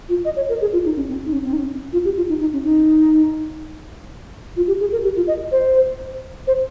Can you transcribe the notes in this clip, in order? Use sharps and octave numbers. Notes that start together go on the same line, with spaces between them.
F4
D#5
C#5
A#4
G#4
F4
D#4
C#4
C4
D#4
C#4
C4
D#4
C#4
F4
G4
F4
D#4
D#4
C#4
D#4
F4
G4
G#4
A#4
G4
F4
D#5
C5
C5